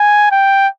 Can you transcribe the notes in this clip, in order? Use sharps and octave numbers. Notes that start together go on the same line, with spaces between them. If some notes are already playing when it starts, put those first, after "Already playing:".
Already playing: G#5
G5